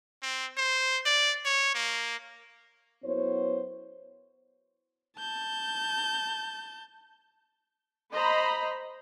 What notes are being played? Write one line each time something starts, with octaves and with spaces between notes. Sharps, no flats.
C4
C5
D5
C#5
A#3
F#2 B3 E4 C5 C#5
A5 G6
C5 D#5 A#5 B5